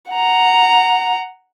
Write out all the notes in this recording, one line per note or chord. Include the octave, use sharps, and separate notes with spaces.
F#5 A#5